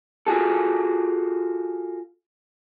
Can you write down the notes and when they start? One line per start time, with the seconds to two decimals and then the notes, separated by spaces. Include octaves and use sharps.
0.27 F4 F#4 G#4 A4